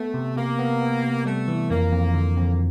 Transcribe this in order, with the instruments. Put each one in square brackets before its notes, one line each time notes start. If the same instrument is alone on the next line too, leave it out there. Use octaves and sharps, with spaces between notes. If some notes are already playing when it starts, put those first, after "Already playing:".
Already playing: [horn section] A3 [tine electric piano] B3
[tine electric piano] C3
[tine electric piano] C3 [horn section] A#3
[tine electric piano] B3
B3
C3
[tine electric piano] G3 [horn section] A3
[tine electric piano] E3
[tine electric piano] F2 [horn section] A#3
[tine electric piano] F2
D3
F2